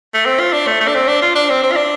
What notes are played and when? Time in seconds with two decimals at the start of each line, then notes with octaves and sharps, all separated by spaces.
0.14 A3
0.26 C4
0.40 F4
0.53 D4
0.67 A3
0.80 A3
0.88 D4
0.95 C4
1.08 D4
1.22 F4
1.35 D4
1.49 C4
1.63 C4
1.72 F4
1.77 D4